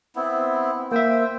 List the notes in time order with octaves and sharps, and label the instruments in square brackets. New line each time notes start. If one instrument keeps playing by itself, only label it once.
[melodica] B3 C4 E4
[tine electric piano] A#3 E5 [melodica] C5 G5